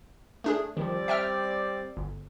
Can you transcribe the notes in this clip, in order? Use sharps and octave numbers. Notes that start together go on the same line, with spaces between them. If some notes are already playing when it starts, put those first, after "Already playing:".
A3 D4 G#4
D#3 F3 G3 C4 D5
E5 G5 F6
G1